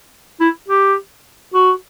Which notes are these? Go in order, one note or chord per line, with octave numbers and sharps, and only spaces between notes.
E4
G4
F#4